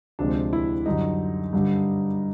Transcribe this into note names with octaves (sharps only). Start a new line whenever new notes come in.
D2 C3 F3 G#3 D4
E4
F#2 D3 G3 D#4
G2 D3 G3